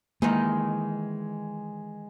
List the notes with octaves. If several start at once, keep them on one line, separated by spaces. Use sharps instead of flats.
D#3 E3 G#3 A#3 D#4